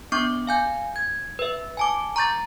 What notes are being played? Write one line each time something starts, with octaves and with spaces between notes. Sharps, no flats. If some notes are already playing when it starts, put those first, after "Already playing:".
B3 D4 C#6 D6 G6
F5 G#5 G6
G#6
B4 E5
G#5 A5 D6
A#5 C#6 G6 A6